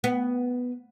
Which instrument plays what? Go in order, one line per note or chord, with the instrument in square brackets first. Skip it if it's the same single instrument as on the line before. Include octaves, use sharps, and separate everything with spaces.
[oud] B3